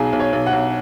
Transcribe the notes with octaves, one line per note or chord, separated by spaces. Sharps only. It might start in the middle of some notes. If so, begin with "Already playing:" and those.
Already playing: B1 G#4
B1
C#5
B1
F#5
B1